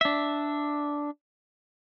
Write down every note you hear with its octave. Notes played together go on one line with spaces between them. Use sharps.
D4 E5